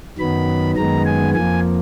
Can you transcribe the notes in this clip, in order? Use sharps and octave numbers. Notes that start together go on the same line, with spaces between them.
F#2 D#3 F#3 B3 B5
F#2 D#3 G#3 B3 A#5
G#5
F2 F3 A#3 G#5